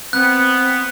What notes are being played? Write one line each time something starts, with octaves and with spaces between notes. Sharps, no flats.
B3 C4 F#6